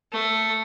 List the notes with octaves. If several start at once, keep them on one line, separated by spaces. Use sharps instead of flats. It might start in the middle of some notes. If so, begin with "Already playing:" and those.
A3